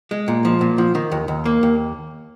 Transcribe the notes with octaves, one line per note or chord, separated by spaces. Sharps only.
G#3
A#2
F3
A#2
F3
D#3
D#2
D#2
A#3
D#2